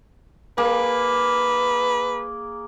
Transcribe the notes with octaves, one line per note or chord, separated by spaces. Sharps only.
A#3 G#4 B4